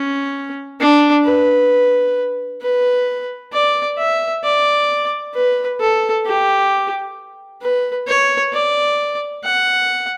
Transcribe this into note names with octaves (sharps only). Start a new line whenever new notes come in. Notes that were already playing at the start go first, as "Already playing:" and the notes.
Already playing: C#4
D4
B4
B4
D5
E5
D5
B4
A4
G4
B4
C#5
D5
F#5